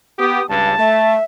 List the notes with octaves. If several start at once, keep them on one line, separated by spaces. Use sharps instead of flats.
B3 G4 D#6
C#2 G2 A5
A3 E5